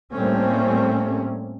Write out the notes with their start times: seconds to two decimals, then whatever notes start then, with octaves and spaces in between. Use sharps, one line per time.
0.12 A2 G3 A3 A#3 C4 C#4